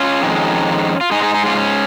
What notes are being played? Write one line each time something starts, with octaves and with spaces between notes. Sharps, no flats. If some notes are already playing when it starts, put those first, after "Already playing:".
Already playing: C#4 F4
F2 D#3 G#3
F4
G#2 G#3 D#4 G#4
D#4 G#4
D#4 G#4
C#4 F4
C#4